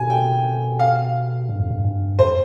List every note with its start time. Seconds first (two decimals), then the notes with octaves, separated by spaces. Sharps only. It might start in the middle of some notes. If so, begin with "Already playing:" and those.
Already playing: B2 G#5
0.10 G5
0.79 F5
1.49 G2
1.60 F2
1.70 G2
1.84 G2
2.19 F2 C5